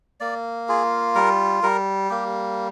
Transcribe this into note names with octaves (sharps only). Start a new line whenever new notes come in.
A#3 D5
F4 G#4
G3 A#4
G3 A#4
A#3 G4